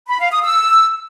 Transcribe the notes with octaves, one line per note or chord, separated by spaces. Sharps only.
B5
F5
D#6
E6